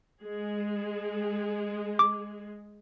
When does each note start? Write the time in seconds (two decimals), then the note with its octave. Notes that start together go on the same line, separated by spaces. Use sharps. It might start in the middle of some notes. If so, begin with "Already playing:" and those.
0.22 G#3 G#4
1.99 D6